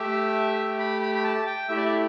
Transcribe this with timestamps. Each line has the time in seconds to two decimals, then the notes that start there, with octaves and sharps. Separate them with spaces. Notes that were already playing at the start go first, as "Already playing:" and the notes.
Already playing: A3 G4 E5
0.79 B5
1.02 B5
1.15 B5
1.24 A5
1.47 G5
1.68 A3 E4 G4 E5
1.77 D5
1.85 E5